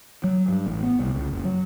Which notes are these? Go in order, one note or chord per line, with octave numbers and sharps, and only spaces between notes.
F#3
G2
A1
B3
C2
C#2
F#1
F#3